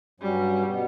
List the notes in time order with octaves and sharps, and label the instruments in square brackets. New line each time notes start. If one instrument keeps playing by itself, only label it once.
[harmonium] G2 F#3 C#4 F#4 [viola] G3
[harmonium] B2 G3 B3